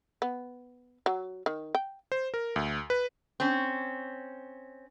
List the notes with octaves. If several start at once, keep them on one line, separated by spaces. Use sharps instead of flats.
B3
F#3
D#3
G5
C5
A#4
D2
B4
C4 C#4